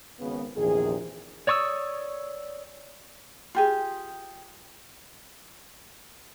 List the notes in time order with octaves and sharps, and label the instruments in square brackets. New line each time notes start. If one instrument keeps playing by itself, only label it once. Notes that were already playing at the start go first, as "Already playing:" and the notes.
[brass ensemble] G#1 C#3 B3
A#1 E2 C3 D#3 G#4
[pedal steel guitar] C#5 D5 C#6 D#6 E6
[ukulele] F4 G4 G#4